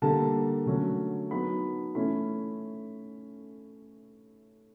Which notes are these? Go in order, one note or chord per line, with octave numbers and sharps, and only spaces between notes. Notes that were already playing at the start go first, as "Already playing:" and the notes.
D3 G3 A#3 A5
D3 F#3 A3 C#4
F#3 B3 D#4 B5
E3 A3 C#4 E4 B5